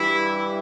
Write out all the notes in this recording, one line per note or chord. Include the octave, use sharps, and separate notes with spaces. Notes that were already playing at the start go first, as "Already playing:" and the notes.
Already playing: G2 E3 G3 E4